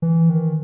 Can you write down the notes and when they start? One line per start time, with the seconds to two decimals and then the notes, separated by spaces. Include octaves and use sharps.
0.02 E3
0.29 D#3